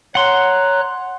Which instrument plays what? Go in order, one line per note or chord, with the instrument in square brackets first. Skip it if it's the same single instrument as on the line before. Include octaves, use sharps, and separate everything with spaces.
[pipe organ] C#5 A#5 F#6 [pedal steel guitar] F#5 C6